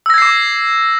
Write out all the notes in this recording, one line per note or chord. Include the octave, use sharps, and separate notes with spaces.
D6 E6 G#6 A#6 C7